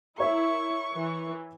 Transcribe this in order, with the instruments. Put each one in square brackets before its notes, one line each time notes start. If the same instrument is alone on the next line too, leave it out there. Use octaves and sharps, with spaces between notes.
[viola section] E4 [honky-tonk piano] A#4 C#5 E5 [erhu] C#6
[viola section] E3